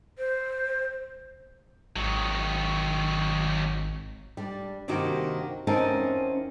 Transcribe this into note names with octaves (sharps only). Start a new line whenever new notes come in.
C5
G#1 D#3 F#3
G3 D4
G2 C3 D#3 A#3 F#4 G4
E2 C4 C#4 D#4 A#4 A5